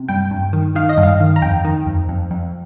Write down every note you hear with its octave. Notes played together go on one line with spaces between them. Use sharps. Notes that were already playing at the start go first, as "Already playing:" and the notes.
Already playing: C3
G2 G5
G2
D#3
D#3 F5
D#5
G2
F5
D#3
A#5
F2 G5
D#3
F2
F2
F2